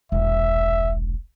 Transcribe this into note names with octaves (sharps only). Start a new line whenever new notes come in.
E1 A#1 E5